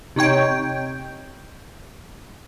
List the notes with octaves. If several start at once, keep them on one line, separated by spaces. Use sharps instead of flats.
C3 D#4 C#5 G5